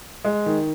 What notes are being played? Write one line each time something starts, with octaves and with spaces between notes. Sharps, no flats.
G#3
D#3